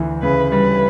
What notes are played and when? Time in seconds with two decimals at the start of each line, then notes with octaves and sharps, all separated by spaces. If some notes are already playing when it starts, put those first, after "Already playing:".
Already playing: D2 E3
0.22 C#3 B4
0.51 G3 B4